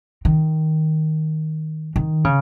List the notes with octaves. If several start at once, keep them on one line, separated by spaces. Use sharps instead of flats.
D#3
D#3
C#3